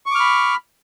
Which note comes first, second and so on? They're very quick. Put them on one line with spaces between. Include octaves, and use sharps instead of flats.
C#6 D6 F6 B5